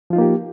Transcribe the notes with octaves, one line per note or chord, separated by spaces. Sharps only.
F3 A#3 D#4 F4 G4